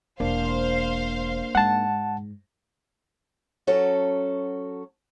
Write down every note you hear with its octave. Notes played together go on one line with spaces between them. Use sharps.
E1 A#3 D4 C5 F5
G#2 F#5 A5
F#3 C#4 F#4 A4